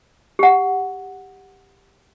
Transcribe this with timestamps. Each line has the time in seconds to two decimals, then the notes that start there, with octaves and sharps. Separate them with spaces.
0.39 G4 F#5